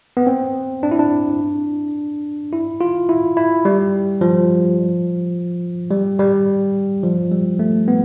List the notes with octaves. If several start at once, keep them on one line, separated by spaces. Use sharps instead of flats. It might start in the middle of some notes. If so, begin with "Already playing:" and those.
B3
C4
D4
E4
D4
E4
F4
E4
E4
G3
F3
G3
G3
F3
G3
A3
B3